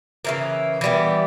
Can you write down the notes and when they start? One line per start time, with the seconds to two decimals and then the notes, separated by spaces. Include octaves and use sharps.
0.25 C#3 E3 A#3
0.81 E3 G3 B3